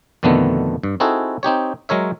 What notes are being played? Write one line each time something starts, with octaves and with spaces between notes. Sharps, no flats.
F2 B2 D3 D#3 A3 B3
G2
C4 D#4 E4 F#4 G#4 A4
C4 D#4 G4 C#5
F#3 G#3 A#4 C#5 E5